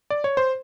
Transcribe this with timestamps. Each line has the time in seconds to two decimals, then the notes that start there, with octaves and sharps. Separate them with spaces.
0.10 D5
0.24 C#5
0.37 C5